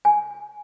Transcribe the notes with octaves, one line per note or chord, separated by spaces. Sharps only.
G#5